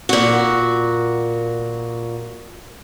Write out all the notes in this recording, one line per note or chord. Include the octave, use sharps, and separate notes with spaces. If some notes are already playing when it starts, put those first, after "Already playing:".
A#2 F#4